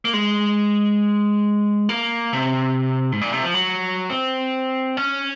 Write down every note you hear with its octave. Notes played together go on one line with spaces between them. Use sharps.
A#3
G#3
A#3
C3
G#2
A#2
C3
F3
F#3
C4
C#4